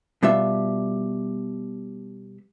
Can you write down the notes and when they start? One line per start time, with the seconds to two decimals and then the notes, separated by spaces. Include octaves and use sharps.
0.23 B2 G3 F4 E5